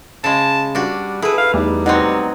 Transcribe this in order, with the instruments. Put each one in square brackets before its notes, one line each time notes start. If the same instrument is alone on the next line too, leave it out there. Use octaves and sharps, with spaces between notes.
[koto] C#3 G#3 [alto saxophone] A5
[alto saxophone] G3 [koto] D4 F#4
[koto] E4 B4 [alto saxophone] G#4 [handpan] A4
[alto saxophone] F5
[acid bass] E2 [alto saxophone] G3 [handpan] A3 D#4
[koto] B2 F#3 C4 [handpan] D#4 D#5 F#5